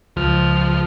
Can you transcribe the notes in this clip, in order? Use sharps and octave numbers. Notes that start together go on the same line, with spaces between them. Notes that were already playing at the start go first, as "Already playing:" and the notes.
C#2 F3 F6